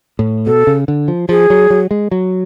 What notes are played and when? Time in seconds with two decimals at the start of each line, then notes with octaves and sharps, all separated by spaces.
0.19 A2
0.46 B2 A4
0.67 C#3
0.88 D3
1.08 F3
1.29 F3 G#4
1.50 F#3
1.70 F#3
1.91 G#3
2.11 F#3